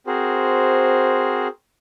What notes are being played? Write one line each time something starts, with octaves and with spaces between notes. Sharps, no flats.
C4 F#4 G#4 A#4 C5